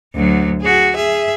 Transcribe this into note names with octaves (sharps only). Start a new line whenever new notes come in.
D2 F#3
F#4 G#4
G#4 E5